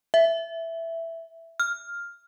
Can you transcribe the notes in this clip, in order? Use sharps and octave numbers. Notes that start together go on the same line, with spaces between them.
E5
F6